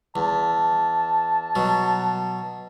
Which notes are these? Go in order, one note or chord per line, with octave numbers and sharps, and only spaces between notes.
E2 A5
B2 F#3